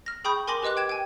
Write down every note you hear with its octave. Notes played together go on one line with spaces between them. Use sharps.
F6 A#6
G#4 G5 B5 C#6 D#6 G6
A#4 G#5 C6 D6 A#6 F#7
G4 B4 D#5 D6 F#6
G5 G#6 E7
G5 G#5